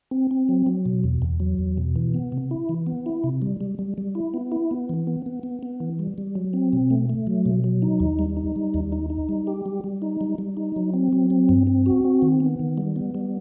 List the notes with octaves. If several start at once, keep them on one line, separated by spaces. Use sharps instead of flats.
C4
C4
F#3
F#3
B2
E2
E2
F#3
E2
B2
E3
B3
C3
E4
E3
B3
E4
C3
G3
G3
G3
G3
E4
B3
E4
B3
E3
B3
B3
B3
B3
E3
G3
G3
F#3
C4
B2
A3
A3
F#3
B2
F#3
D#4
D#2
G3
D#4
G3
D#2
D#4
D#4
G3
G4
G3
G3
D#4
G3
G3
D#4
F#3
C4
F#3
C4
G2
C4
F#4
C4
D#3
B3
D#3
G3
B3
G3